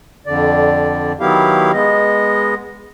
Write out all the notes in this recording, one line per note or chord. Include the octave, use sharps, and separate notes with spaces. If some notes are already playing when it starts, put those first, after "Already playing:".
F2 D3 D5
D#3 F#3 B3 E4 G4 F5
G#3 B3 D#5